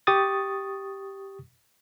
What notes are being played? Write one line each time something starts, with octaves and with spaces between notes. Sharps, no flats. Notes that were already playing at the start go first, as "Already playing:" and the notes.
G4 C#6 D#6 A6